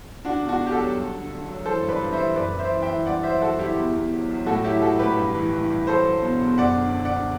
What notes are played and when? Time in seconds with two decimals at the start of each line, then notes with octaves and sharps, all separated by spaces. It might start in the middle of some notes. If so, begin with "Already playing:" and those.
0.25 D3 D4 F#4
0.43 E2
0.48 D4 F#4
0.61 E2
0.66 G4
0.71 F#4 A4
0.78 F#3
0.96 G2
1.13 D3
1.30 D3
1.48 F#3
1.66 E3 A4 C5
1.83 G2
1.89 B4 D5
2.01 G2
2.13 C5 E5
2.18 E3
2.36 F#2 B4 D5
2.53 F#2
2.59 C5 E5
2.70 E3
2.82 E5 G5
2.88 E3
3.06 G2 D5 F#5
3.23 F#3 C5 E5
3.42 F#3 F#4 A4
3.59 G2 E4 G4
3.77 E2
3.94 E2
4.12 F#3
4.30 F#3
4.46 A2 F#4 A4
4.64 F#3 E4 G4
4.82 F#3 F#4 A4
4.99 A2 G4 B4
5.17 G2
5.35 E3
5.52 E3
5.70 G2
5.87 F#3 A4 C5
6.05 F#3
6.22 B2
6.41 E2
6.58 F#2 D5 F#5
6.76 D3
6.93 D3
7.05 D5 F#5
7.11 D3